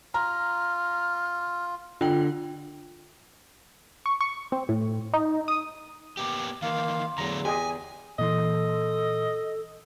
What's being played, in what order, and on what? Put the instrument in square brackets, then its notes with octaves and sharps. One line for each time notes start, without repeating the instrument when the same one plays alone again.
[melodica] F4 [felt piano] A#5 [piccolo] F6
[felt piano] D3 [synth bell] F4 G5
[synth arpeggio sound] C#6
C#6
C4
A2
D#4
D#6
[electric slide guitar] A#3 B3 G4 [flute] D6
[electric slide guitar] D#3 E3 [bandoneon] A#3 F5 [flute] C6
[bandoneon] E2 [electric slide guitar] D3 F#3 A3 [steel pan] A#5
[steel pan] G4 G#4 D#5 [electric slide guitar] G#5
[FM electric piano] A#2 E3 C6 [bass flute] A4 [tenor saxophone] D#5